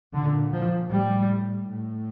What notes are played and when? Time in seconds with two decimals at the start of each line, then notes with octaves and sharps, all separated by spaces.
0.14 A#2 D3
0.53 F3
0.90 A2 G3
1.66 A2